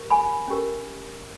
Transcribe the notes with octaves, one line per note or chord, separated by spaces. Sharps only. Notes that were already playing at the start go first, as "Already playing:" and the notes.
Already playing: G4 A#4
G#5 B5
C#4 G4 A#4